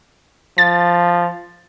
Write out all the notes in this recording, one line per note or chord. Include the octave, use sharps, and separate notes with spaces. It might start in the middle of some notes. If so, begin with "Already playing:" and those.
F3 A6